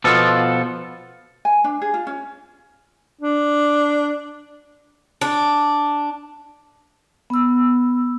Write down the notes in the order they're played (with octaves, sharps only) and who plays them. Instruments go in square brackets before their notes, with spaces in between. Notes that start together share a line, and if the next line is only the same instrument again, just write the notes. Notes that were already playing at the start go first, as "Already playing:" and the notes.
[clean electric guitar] B2 F3 B3 F4 A4
[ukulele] G#5
D4
G#4
F4
C#4
[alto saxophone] D4
[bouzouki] D4
[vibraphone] B3 E6